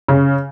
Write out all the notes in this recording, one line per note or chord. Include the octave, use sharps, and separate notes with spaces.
C#3